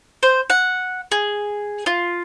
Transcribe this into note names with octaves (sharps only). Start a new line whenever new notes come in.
C5
F#5
G#4
F4